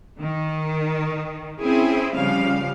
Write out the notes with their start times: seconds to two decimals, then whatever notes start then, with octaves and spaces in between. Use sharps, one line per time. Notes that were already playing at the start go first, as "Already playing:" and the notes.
0.20 D#3
1.61 C4 C#4 E4 G#4
2.15 C#3 F3 G3 F5